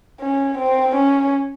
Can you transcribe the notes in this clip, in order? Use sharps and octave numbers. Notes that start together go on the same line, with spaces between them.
C#4
C4
C#4